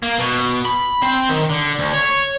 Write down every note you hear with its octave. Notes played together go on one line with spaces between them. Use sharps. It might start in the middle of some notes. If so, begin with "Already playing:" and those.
A#3
B2
B5
C4
D#3
D3
D2
C#5